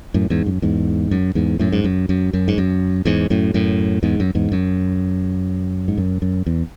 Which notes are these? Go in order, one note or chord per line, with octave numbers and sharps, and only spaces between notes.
F#2 A2
E2 G#2
F#2
E2 G#2
F#2
E2 G#2
F#2 A2
G#2
F#2
F#2
F#2
G#2
F#2
E2 G#2
F#2 A2
F#2 A2
E2 G#2
F#2
E2 G#2
F#2
G#2
F#2
F#2
E2